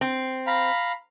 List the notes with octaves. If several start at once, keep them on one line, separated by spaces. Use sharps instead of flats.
C4
F5 A#5 B5